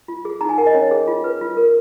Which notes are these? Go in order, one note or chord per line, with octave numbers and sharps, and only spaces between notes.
F4
G#4
D#4 A#5
G#5
A#4 F#5
D#5
C#4 C#5
G#4
F4
B4
F4
A#4